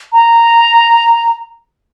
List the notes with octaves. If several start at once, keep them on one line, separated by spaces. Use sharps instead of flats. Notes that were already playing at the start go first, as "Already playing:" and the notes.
A#5